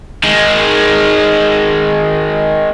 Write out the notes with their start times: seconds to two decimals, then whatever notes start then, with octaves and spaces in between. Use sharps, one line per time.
0.24 D#3 G#3